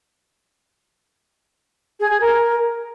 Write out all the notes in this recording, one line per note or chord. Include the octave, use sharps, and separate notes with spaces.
G#4
G#4
A#4